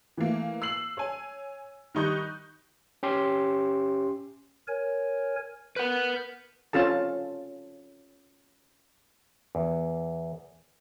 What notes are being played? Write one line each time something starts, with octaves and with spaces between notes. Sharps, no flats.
E3 A3 A#3
E6 C7 F#7
C#5 G#5
D#3 G3 D#4 C#6 F#6 G6
C#4 G4 C6
A#4 C#5 G#5
A#4 B4 F#5 G6
C4 C#4 F4 A4 A5
E2